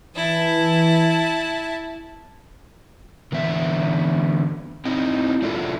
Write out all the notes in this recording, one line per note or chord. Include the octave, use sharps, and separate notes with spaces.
E3 E4 A5
D3 E3 B3 E5
C4 D#4 E4
F#3 D4 E4 F4 A4